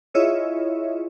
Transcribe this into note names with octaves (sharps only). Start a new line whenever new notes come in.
E4 F4 G#4 C#5 D#5 E5